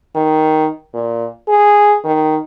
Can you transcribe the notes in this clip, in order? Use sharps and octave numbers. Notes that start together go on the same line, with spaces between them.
D#3
A#2
G#4
D#3